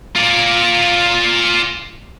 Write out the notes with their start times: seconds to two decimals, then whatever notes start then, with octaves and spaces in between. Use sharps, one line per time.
0.16 F4 D5